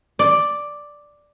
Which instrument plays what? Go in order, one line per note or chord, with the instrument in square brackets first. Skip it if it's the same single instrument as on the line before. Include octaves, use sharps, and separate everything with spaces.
[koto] D5